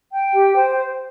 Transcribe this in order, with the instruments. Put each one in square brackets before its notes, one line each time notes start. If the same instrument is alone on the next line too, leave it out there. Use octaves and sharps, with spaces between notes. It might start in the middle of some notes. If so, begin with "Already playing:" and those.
[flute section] G5
G4
C5